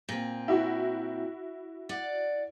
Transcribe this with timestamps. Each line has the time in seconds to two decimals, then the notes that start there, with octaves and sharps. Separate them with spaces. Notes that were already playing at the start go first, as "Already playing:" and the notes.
0.09 A#2 C4
0.48 E4 F#4
1.89 D5 F#5